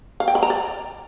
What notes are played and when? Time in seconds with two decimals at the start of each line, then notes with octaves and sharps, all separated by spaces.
0.20 F5
0.28 G5
0.35 B5
0.43 A#5
0.50 D5